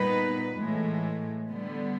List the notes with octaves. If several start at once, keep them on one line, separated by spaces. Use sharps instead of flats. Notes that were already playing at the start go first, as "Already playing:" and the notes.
Already playing: A#2 G3 B3 D#4 B4
A2 E3 G#3
D3 G3 B3